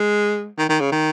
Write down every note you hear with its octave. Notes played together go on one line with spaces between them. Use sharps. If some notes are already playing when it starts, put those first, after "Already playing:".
Already playing: G#3
D#3
D#3
C#3
D#3